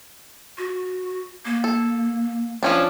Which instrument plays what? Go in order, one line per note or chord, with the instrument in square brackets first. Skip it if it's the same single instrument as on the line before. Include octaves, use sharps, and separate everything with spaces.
[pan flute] F#4
A#3
[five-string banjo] A4
F3 C#4 D4